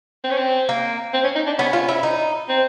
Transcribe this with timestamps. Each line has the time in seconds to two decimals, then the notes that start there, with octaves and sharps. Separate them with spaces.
0.24 C4
0.31 C#4
0.38 C4
0.69 A#3
1.14 C4
1.24 C#4
1.36 D#4
1.47 D4
1.58 B3 C#4
1.73 F4
1.88 E4
2.03 D#4
2.49 C4